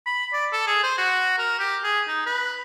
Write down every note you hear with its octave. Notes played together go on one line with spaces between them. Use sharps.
B5
D5
A4
G#4
C5
F#4
A#4
G4
G#4
D#4
B4